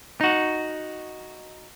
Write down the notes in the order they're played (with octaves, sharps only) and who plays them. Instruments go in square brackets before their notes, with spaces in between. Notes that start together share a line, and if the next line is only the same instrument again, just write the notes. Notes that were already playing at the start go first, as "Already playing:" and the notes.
[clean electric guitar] D#4 F#4